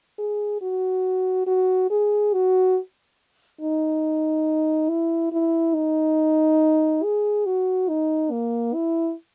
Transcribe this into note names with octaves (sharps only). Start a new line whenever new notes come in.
G#4
F#4
F#4
G#4
F#4
D#4
E4
E4
D#4
G#4
F#4
D#4
A#3
E4